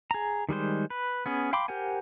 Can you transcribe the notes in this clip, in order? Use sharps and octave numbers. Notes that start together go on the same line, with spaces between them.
G#4 A#5
D#3 G3 G#3 C5
B4
B3 C#4 G#4
F5 G5 B5 C6 D6
G4 A#4 C5 F#5 G#5